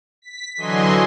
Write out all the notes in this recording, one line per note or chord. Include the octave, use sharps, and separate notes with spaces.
B6
D3 E3 F#3 D#5 G#5 C6